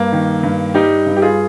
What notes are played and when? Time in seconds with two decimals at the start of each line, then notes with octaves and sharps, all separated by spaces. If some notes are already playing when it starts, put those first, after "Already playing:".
Already playing: G2 A#3
0.12 D#3
0.43 G2
0.74 G3 D#4 G4
1.06 G2
1.16 G4
1.22 F4 G#4